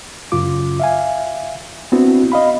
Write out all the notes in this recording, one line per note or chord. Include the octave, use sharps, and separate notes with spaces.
F#2 C#3 F4 D6
E5 F5 G#5
B3 C4 D4 E4 F#4
D#5 F5 B5